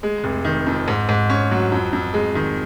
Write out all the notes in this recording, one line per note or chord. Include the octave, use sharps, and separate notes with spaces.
G#3
F1
D#3
F2
G#2
G#2
C#4
F#3
F2
F2
G#3
D#3